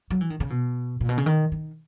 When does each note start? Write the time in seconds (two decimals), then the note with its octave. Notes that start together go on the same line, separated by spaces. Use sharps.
0.10 F#3
0.21 E3
0.30 D#3
0.40 C#3
0.50 B2
1.01 A#2
1.09 B2
1.18 C#3
1.26 D#3
1.52 D#3